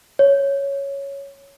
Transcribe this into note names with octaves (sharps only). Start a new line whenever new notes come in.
C#5